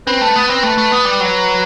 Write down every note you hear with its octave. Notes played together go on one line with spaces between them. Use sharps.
C4 B4
A3
B3
C4
A3
A3
B3
G3
F#3